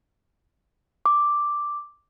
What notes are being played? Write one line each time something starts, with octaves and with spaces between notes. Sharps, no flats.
D6